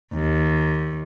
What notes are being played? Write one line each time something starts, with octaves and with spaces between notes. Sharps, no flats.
D#2